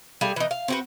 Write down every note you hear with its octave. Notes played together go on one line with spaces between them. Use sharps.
G3 A3 G#4 F5
E3 D#4
F5
C4 F#4 B4